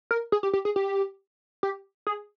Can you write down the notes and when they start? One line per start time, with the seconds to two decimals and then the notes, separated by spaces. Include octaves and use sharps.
0.11 A#4
0.32 G#4
0.43 G4
0.53 G4
0.65 G#4
0.76 G4
1.63 G4
2.07 G#4